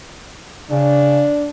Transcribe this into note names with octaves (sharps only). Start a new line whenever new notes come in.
C#3 D4